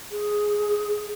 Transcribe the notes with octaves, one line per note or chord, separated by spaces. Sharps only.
G#4